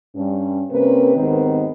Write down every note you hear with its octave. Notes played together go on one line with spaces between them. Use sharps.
G2 C#4
C3 A#3 C4 C#4 A#4 B4
D#2 G#2 D#3 B3 C4 D#4